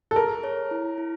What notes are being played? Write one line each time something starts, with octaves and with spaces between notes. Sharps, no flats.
A4
G#4 A#4
C#5
E4
E4